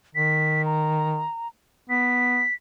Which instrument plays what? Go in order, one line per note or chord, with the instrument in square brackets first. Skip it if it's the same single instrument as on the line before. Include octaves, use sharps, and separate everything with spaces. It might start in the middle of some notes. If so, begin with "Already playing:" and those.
[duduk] D#3 [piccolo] B6
[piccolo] A#5
[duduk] B3 [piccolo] B6